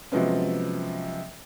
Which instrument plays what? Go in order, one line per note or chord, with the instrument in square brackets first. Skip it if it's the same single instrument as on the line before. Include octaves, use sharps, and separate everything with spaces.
[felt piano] C3 F3 F#3 G#3 B3 C#4